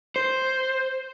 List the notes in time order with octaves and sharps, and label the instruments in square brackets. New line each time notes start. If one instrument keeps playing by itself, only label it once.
[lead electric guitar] C5